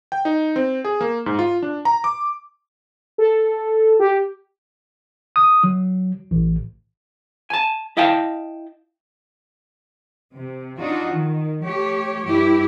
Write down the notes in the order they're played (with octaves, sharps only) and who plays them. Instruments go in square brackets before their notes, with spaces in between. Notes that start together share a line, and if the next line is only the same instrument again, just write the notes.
[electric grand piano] G5
D#4
C4
G#4
A#3
G#2
F4
D4
A#5
D6
[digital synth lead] A4
G4
[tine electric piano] D#6
F#3
A1
[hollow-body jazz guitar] G#5 A5
E4 D#5 F5 G5 A5
[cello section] C3
D4 D#4 F4 F#4
D#3
A3 G4 C#5
G2 E4 G4